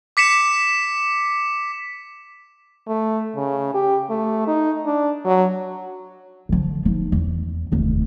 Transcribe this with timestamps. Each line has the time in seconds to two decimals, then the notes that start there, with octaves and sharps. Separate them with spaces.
0.17 D6 B6 C#7 E7
2.88 A3
3.37 C#3
3.74 G4
4.10 A3
4.47 D#4
4.86 D4
5.25 F#3
6.49 D3 F3
6.85 F3 D#4
7.12 E2
7.72 F1 D#2